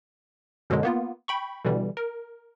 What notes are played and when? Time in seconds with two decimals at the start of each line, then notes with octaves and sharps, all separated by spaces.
0.70 F#2 B2 D3 F#3 G#3
0.83 A#3 B3 F4
1.28 G5 B5 C#6
1.65 B2 D3 E3 G3
1.97 A#4